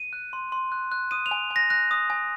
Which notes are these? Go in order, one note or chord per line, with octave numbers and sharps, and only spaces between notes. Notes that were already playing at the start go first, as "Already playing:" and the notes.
Already playing: D#7
F#6
C6
C6
F#6
F#6
D#6 D#7
F7
G#5
G#5
A#6
F#6 A#6
D#6
G#5